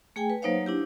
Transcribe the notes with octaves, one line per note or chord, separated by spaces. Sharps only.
A3 G#4 G5 G#5
B4
F#3 A#3 D#4 C5 C#5 F5
D4 E4 G4